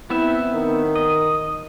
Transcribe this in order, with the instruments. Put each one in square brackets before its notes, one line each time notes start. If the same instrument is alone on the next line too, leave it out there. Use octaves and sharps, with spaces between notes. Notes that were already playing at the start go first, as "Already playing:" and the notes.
[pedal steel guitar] B3 C4 E5 [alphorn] E4
[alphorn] D#3
[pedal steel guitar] D#5